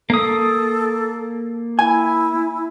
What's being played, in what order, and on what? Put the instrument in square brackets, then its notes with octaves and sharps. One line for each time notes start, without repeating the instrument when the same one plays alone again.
[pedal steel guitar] A#3 D#6 [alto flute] A4
[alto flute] E4 [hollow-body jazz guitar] G#5